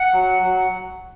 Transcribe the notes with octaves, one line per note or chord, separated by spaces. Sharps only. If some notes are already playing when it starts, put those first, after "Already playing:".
Already playing: F#5
F#3
F#3